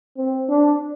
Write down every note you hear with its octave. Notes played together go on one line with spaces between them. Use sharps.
C4
D4